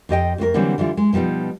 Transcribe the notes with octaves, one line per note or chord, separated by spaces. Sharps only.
F2 G4 D#5 G5
F2 A3 F#4 A#4
D3 E3 F#3 G3 A#3 C4
D3 E3 G3 F4
G#3
B2 F3 G3 B3 D#4